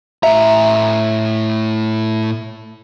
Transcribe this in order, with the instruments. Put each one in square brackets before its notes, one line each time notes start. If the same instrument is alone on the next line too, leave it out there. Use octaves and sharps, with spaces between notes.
[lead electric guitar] A2 A#5 [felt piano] E5